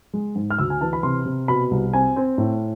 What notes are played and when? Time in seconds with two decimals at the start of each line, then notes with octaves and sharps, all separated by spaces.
0.13 G#3
0.35 G#2
0.50 F6
0.59 D2 E6
0.70 G#5
0.81 E3 A5
0.93 B5
1.03 C3 C6
1.26 C3
1.48 B2 B5
1.71 C2
1.93 C4 G#5
2.16 C4
2.38 A2